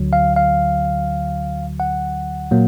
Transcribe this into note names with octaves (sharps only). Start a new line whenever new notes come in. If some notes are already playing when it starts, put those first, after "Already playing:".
Already playing: D2 D3 F#3
F5
F5
F#5
A#2 F#3 A#3